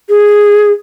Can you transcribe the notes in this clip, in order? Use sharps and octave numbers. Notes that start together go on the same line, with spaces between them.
G#4